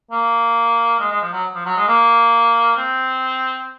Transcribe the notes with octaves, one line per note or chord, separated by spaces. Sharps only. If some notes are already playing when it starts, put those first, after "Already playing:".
A#3
G#3
G#3
F3
F#3
F3
F#3
G#3
A#3
C4